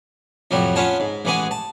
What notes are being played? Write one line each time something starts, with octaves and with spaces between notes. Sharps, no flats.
F2 A2 C3 F#3 G3
B3 C#4 F4 C#5 A5
G#2
A1 E3 G#3 B3 G#4 G#5
A5